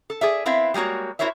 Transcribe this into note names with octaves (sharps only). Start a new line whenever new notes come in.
A4
G#4 D5 E5
B3 C4 E4 E5 F5
G3 G#3 A#3 F#4 C#5
E4 F#4 A#4 C5 C#5 E5